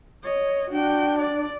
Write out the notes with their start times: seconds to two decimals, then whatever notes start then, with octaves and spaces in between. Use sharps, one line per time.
0.23 C#5 D#5
0.71 D4 F#4 G5
1.19 D5